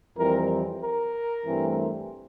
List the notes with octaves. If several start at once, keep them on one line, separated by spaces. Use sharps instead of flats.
F2 E3 G3 C4 A#4
A#4
G2 E3 A3 C4